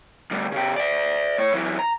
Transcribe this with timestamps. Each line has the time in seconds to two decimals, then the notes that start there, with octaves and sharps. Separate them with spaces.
0.31 D2 G3
0.52 C#3 G4
0.76 D5 E5
1.38 A2 C#5
1.54 F#2 E3
1.79 A#5